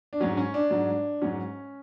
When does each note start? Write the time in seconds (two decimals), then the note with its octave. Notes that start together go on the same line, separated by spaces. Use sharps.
0.13 D4
0.20 G#2 F#3 C#4
0.37 C#4
0.54 D4
0.71 G#2 F#3
1.22 G#2 F#3 C#4